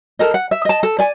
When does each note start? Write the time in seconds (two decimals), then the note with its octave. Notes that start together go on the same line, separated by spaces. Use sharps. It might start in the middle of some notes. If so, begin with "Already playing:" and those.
0.19 A4 A#4 D#5
0.34 F#5
0.51 E5
0.65 D#5 A5
0.83 A4
0.99 D5 G#5